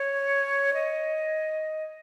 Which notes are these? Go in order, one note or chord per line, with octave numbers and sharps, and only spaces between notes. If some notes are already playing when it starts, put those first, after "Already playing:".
Already playing: C#5
D#5